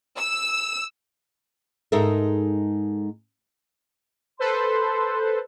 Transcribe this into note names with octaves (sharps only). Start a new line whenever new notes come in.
E6
G#2 G#3 D#4 A4 A#4 E5
A4 B4 C5 C6